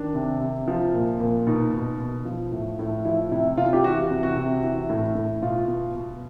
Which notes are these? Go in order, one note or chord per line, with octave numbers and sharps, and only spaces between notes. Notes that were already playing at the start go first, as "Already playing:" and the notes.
Already playing: D#3 D4
C3
C3
F3
A#2
A#2
B2 D#4
B2
B2
F3
A2
A2
F3 E4
C3 E4
C3 F4
G4
E3 F#4
C3
F#4
C3
E3
A2
A2
B2 F4
B2
B2